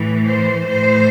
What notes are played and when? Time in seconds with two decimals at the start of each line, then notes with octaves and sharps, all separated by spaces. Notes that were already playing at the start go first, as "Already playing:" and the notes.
Already playing: A2 E3
0.28 C5
0.69 A2 E3 C5